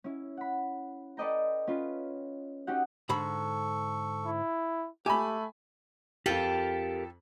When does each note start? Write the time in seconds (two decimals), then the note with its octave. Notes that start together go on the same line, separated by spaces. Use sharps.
0.04 C#4 E4
0.37 F#5 B5
1.17 A4 B4 D5 D#5 G5 A#5
1.67 C#4 F4 B4
2.67 C#4 D#4 F#4 G4 D#5 F#5
3.09 G#2 D3 A4 B5 C#6
4.26 E4
5.06 A3 G4 E5 G#5 B5
6.26 F2 F4 G4 A4 A#4 F5 G5 F#7